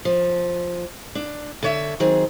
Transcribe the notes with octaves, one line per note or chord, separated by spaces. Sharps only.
F3
D4
D3 C#5 E5
D#3 F#3 C4 G#4